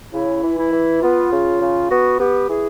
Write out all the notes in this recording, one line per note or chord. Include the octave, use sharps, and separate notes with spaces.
C#3 E4
E3
E4
E3
B3 F4
C#3
C#3
B3 F#4
B3 G4
E3 G#4